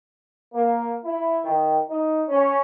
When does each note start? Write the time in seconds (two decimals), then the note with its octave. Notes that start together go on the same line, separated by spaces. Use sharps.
0.53 A#3
1.04 E4
1.44 D#3
1.89 D#4
2.29 C#4